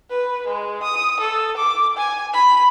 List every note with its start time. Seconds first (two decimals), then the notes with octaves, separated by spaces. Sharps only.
0.10 B4
0.47 G#3
0.83 D#6
1.20 A4
1.57 D6
1.97 G#5
2.33 B5